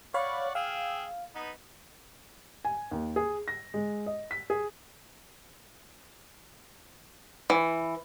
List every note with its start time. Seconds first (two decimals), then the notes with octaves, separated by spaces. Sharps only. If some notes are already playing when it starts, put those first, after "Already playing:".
0.14 C#5 D5 F5 F#5 B5 C#6
0.55 G#4 F5 G5 E6
1.35 B3 D#4 B4
2.65 G#5
2.91 D#2
3.16 G#4
3.48 A#6
3.74 G#3
4.06 D#5
4.31 B6
4.50 G#4
7.50 E3